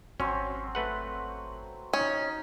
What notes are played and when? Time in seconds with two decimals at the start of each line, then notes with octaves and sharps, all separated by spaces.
0.20 G#1 F#3 C4 C#4 C6
0.75 A3 B4 F#5
1.93 C#4 D#4